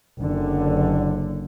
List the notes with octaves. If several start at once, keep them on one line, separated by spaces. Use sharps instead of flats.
F#1 D3